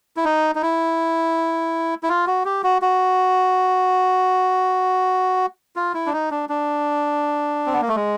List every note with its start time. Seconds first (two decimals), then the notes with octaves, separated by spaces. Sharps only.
0.17 E4
0.25 D#4
0.55 D#4
0.62 E4
2.03 E4
2.09 F4
2.27 F#4
2.45 G4
2.64 F#4
2.82 F#4
5.76 F4
5.94 E4
6.06 D4
6.13 D#4
6.31 D4
6.49 D4
7.66 C4
7.73 B3
7.81 A#3
7.88 A3
7.96 G#3